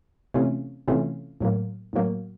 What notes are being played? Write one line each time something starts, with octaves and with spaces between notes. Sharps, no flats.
C3 E3 A3 C#4 F4
C3 E3 A3 C#4 F4
A2 F#3 A#3
A2 F#3 A#3